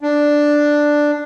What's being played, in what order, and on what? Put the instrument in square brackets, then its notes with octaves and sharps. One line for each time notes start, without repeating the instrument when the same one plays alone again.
[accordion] D4